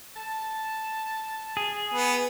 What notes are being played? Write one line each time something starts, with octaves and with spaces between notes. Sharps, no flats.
A5
G#4
B3